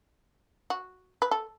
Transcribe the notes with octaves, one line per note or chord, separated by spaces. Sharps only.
F#4
B4
A4